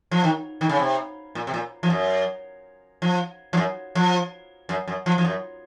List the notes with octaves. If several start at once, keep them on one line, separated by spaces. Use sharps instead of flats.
F3
D#3
D#3
C#3
C3
A#2
C3
A#2
F3
F#2
F3
F3
F#2
F3
F#2
F#2
F3
F3
F#2